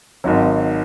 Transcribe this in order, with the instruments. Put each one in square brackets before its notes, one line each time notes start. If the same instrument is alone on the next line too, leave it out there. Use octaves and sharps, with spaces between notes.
[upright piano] G#1 G#2 F#3